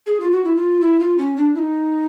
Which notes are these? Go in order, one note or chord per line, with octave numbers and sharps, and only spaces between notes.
G#4
F4
F#4
E4
F4
E4
F4
C#4
D4
E4
D#4